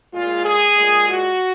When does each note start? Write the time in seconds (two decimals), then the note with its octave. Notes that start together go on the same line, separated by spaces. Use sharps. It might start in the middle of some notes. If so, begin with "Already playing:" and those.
0.12 A#2 G#3 F4
0.44 G#4
0.75 A#2 G#3
1.08 F#4